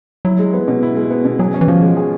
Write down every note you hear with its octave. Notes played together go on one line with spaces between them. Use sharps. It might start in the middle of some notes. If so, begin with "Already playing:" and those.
F#3 E4
G#3
B3
B2
E4
G#3
B3
B2
F#3 G#4
C#4
E3
F3 F4
G#3
G#4